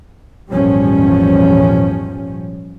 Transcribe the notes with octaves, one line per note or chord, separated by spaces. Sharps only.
G#1 E2 A#2 F3 G3 C#4